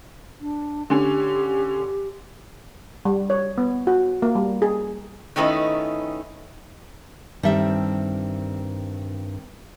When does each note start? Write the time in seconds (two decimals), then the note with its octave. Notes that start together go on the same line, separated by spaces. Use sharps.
0.41 D4
0.90 D3 C#4 G4
3.05 G3
3.30 C#5
3.58 B3
3.87 F#4
4.22 A#3
4.35 G3
4.62 G#4
5.36 D#3 A3 C#4 D#4 E4 B4
7.43 G2 D#3 G3 C4 A4 E5